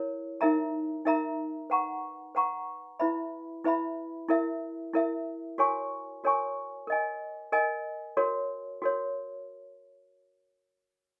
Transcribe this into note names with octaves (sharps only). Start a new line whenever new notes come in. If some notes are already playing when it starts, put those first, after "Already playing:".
Already playing: E4 A#4 C#5
D#4 A#4 E5 A#5
D#4 A#4 E5 A#5
B4 F#5 A#5 C#6
B4 F#5 A#5 C#6
E4 B4 E5 B5
E4 B4 E5 B5
E4 A#4 E5
E4 A#4 E5
F#4 A#4 C#5 G#5 C#6
F#4 A#4 C#5 G#5 C#6
A#4 D#5 G#5
A#4 D#5 G#5
F#4 A#4 C#5
F#4 A#4 C#5